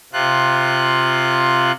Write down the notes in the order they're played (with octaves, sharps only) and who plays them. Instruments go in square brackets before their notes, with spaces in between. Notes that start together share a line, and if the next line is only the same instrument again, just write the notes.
[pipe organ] C3 F4 F#6